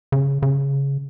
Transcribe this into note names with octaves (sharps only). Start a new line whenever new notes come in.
C#3
C#3